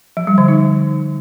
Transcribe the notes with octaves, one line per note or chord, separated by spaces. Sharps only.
F3
G3
D3
D#4